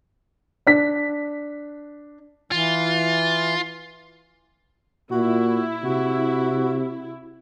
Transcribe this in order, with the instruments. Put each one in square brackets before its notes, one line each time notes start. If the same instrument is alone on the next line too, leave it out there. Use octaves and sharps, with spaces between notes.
[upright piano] D4 B6
[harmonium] E3 [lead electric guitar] F4
[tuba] A#2 [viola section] E4 [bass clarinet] F#4
[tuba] C3 [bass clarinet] F#4